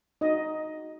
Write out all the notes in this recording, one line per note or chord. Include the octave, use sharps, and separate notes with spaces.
D#4 F#4 D#5